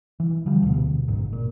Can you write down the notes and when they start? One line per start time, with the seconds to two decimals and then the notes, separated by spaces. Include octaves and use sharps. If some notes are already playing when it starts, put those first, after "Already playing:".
0.20 E3
0.46 D3 F3 G3
0.63 D2 B2
1.08 G#1 C#2 G#2
1.33 A#2